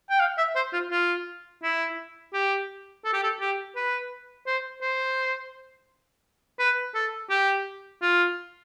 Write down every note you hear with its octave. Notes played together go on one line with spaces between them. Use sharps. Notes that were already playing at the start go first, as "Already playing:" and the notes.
G5
F5
E5
C5
F4
F4
E4
G4
A4
G4
A4
G4
B4
C5
C5
B4
A4
G4
F4